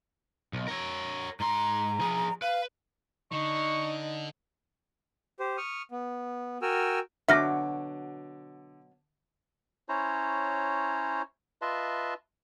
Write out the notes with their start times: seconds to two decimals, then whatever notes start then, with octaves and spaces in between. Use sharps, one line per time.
0.53 B1
0.68 A#4 C#5
1.40 G#2 A#5 C6
2.00 F3 G#4
2.42 B4 F5
3.32 D3 D#4 C#6
5.40 G4 C5
5.57 C#6 D#6 F6
5.91 B3
6.62 F#4 A#4 G5 G#5 E6 F6
7.28 B2 D3 F#3 E5 D6 F6 A#6
9.89 C#4 E4 C5 C#5 A#5
11.62 F4 B4 D#5 E5 A5 C6